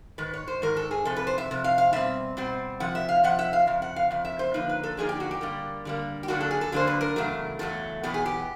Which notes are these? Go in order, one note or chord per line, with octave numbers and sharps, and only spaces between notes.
G#2 D#3 B4
C#5
C5
G#2 D#3 A#4
A4
G#4
F2 C3 A4
B4
C5
E5
F2 C3
F5
F5
B2 G3 C4 E5
B2 G3 C4
C3 F3 F#5
E5
F5
C3 F3 F#5
E5
F5
F2 C#3
F#5
F5
F2 C#3
E5
C5
D3 F3 A#3 D#4 B4
B4
A4
D3 F3 A#3 D#4 G#4
G4
F#4
G4
D3 G3 A#3
D3 G3 A#3
G4
D3 F#3 A#3 D4 F#4
A4
G#4
A4
D3 F#3 A#3 D4 C5
B4
A#4
E2 C#3 F#3 A3
E2 C#3 F#3 A3 A4
E2 B2 F#3 B3 G4
G#4
G4